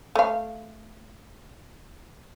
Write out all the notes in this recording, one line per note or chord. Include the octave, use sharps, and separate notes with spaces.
A3 F5